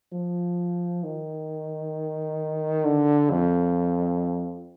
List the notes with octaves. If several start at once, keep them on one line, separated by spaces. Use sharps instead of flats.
F3
D#3
D3
F2